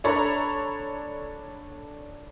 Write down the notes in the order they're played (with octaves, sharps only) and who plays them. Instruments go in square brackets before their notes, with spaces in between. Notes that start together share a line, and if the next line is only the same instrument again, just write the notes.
[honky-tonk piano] D4 A4 C#5 A#5 B5 C#6